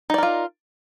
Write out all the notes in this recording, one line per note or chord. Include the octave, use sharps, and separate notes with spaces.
D#4 F4 A#4 D5